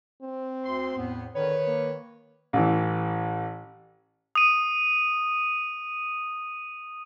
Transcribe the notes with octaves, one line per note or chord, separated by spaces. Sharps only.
C4
D2 C6
E2 A2 B3
D3 D#3 B4 C#5
A#3
A1 E3
D#6 D#7